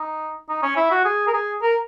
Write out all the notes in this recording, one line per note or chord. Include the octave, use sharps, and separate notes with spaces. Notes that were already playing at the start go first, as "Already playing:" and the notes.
Already playing: D#4
D#4
C#4
E4
F#4
G#4
A#4
G#4
A#4